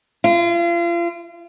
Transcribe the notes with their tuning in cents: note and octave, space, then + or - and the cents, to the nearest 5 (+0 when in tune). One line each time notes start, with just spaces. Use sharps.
F4 -35